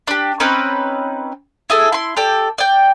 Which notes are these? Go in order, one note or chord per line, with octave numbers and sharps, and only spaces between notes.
D4 G4
C4 C#4 D#4 B4
E4 G#4 A4
E4 C6
G4 A4 D5
D5 G5